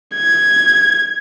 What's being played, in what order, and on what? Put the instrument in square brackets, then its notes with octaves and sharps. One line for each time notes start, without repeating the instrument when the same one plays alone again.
[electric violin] G#6